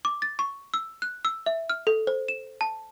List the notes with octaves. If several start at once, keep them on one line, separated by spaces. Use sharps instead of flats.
D6
A6
C#6
E6
F#6
E6
E5
F6
A4
C5
E7
A5